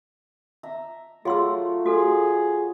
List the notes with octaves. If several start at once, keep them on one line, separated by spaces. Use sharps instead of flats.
E5 A#5
F#3 A3 F4 G#4 C6 E6
F#4 G#4 A4